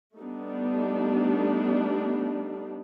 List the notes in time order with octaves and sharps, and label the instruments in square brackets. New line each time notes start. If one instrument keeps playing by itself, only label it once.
[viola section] G3 A3 B3 D4 D#4